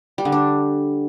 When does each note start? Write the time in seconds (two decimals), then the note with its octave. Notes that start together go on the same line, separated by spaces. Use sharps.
0.18 G3
0.25 D3
0.32 D4